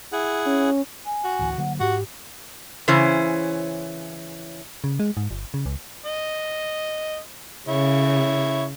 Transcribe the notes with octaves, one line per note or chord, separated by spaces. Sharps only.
E4 G#4 F#5
C#4
G#5
F#4
A1 D2 E3
D3 F#3 A#3 F#5
G#2 F#4 G4
C#3 E3 C#4 C5
C#3
G#3
G#2
G1
C#3
C#2
D#5
C#3 E4 C#5